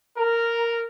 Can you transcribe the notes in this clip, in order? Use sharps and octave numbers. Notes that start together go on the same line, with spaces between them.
A#4